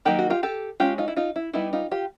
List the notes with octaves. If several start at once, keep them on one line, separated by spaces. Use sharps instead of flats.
D#3 F#3 A#3 D#4 G4
F#4
F4 G4
G4 A4
G#3 C#4 F4 G4
D#4 F4
E4
D#4 F4
E4
G3 B3 D#4 E4
D#4 F4
F4 G4